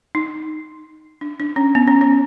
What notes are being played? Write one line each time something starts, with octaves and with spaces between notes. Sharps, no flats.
D#4
D4
D4
C#4
B3
C#4
C#4